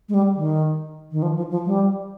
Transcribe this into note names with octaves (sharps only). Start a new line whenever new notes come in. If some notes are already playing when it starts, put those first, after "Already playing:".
G#3
G3
D#3
D#3
F3
F3
F3
G3